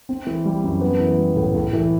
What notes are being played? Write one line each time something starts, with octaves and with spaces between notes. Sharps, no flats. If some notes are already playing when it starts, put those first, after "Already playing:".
C4
E3
G3
F#2
B3
E3
G3
A2
A2
E3